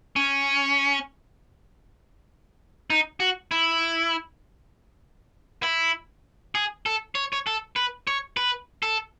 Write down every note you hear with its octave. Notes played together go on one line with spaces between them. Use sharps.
C#4
D#4
F#4
E4
E4
G#4
A4
C#5
C#5
A4
B4
C#5
B4
A4